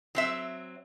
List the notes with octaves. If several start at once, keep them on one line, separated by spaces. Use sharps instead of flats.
F#3 C4 E5